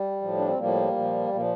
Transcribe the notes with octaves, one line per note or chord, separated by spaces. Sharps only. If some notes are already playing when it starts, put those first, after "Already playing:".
Already playing: G3
A2 F3
D4
C4
A2 F3 G3 A#3
A#2 F3
A#2 F3 A#3